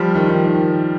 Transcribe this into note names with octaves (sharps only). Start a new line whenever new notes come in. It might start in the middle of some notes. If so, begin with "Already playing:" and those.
Already playing: F3 G3
D#3
D#3
D#3